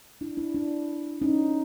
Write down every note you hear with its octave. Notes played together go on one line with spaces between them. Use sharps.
D4 E4
D4 E4
D4 E4
C#4 D#4